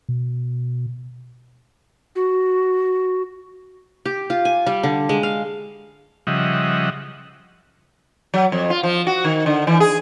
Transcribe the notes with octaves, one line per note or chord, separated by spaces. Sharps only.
B2
F#4
G4
F4
G#5
G3
D3
G#3
F5
C#3 F3 G3 D#5 E5 F#5
F#3
F2
F4
F3
F#4
D#3
D3
E3
G#4